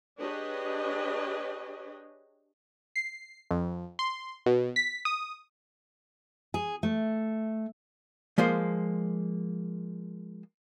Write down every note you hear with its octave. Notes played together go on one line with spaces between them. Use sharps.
D4 G4 G#4 B4 C#5 D#5
C7
F2
C6
B2
B6
D#6
G#4
A3
F3 G#3 A#3 C5